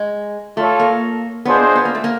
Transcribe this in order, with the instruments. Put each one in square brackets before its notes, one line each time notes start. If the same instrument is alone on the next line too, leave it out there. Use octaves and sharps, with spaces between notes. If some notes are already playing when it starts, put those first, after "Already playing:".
Already playing: [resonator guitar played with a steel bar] G#3
[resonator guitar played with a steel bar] A3 [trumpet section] F4 A4 C#5
[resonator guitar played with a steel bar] A#3
[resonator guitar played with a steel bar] B3 [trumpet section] D4 F4 G#4 C5 D#5
[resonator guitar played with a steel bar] B3
A#3
A3
A#3